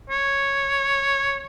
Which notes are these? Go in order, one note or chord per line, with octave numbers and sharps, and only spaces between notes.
C#5